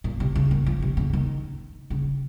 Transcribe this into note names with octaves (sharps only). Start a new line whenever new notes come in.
A#2
C3
C#3
D#3
F3
C3
C#3
D#3
C#3